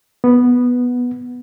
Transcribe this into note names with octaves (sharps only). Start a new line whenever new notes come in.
B3